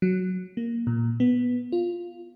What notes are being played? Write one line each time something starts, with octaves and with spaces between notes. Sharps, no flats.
F#3
A#3
A#2
B3
F4